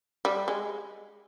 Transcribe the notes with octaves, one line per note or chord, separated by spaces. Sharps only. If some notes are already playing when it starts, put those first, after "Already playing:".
G3
G#3